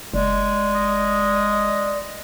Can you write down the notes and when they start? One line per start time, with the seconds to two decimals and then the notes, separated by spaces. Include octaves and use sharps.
0.14 F#1 G#3 D5
0.75 D#5